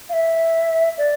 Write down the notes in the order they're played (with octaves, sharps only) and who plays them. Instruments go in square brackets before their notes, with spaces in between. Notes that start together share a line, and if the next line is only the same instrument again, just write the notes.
[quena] F5
E5
D5